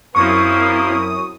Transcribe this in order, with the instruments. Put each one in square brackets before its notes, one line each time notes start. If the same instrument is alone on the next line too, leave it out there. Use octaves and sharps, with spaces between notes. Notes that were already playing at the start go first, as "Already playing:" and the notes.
[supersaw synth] F#2 D#6 [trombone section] F3 A#3 [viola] C4 E4 [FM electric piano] C#6